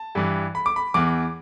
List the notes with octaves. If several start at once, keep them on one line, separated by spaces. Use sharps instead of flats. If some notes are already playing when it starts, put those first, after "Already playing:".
Already playing: A5
G2 E3
B5
D6
B5
E2 E3 D6